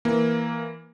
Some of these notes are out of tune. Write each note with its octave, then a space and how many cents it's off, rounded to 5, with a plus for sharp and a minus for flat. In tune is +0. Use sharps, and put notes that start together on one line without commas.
E3 +0 A#3 +0